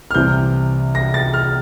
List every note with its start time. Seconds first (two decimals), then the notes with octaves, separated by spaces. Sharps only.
0.11 F6
0.14 C2 C3 E3 G6
0.95 A#6
1.14 A6
1.34 F6